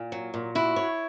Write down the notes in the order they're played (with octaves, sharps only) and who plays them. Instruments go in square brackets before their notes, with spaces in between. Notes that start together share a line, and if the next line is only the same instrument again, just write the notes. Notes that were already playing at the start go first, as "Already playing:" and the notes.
Already playing: [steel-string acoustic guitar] A#2
F#3
A#2
[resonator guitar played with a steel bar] E4 [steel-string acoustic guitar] F#4
[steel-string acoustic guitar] C#5